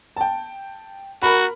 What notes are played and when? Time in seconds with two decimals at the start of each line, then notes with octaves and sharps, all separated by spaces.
0.16 G5 A5
1.22 F#4 A#4 B5